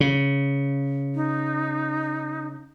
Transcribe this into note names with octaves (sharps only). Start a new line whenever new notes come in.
C#3
D#4